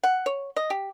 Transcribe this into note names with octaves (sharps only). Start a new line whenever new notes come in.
F#5
C#5
D#5
G4